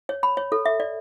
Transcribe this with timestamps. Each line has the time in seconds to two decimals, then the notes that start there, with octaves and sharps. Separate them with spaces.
0.09 C#5
0.23 B5
0.37 C#5
0.52 A4
0.66 E5
0.80 D5